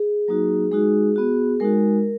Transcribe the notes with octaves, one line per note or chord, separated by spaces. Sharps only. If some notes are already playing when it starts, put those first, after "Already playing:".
Already playing: G#4
F#3 A#3 D#4 F#4
G#3 D#4 F#4 G#4
B3 F#4
G#3 D#4 F#4 A#4